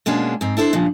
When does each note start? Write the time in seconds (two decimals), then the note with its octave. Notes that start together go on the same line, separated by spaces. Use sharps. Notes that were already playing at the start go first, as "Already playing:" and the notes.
0.06 B2 G#3 A#3 C#4 D4
0.41 G#2 C4
0.57 D4 E4 A4 C5
0.73 G2 A#2 C#3 F3